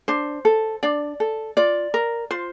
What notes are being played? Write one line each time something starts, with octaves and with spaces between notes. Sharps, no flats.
D4 C5
A4
D4 D5
A4
F4 D5
A#4
F4 C5